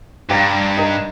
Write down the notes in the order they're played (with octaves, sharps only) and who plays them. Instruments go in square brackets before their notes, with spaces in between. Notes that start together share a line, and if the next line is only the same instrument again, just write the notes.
[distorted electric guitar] G2 [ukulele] G4 C5 F5 A#5
[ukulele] D#4 G4 A#4